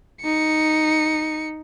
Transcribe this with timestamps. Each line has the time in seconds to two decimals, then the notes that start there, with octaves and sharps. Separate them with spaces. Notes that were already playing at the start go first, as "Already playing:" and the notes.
0.23 D#4 C#7